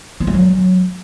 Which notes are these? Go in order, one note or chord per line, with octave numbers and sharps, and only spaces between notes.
F4
G3
F#3